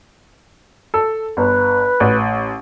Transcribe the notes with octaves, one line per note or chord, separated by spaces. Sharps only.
A4
G1 B4
A1